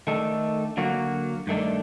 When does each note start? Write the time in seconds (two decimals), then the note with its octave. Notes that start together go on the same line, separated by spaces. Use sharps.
0.07 D#3 A3 D4 A4
0.77 D3 F#3 A#3 F#4
1.47 G2 D#3 A3 D4